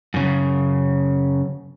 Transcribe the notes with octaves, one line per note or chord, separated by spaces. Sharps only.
F#2 C#3